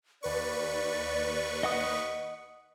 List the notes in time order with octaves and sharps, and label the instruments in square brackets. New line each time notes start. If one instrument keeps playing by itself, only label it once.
[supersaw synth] D#2 B4 C#6 [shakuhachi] D5
[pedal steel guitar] D#5 F#5 D#6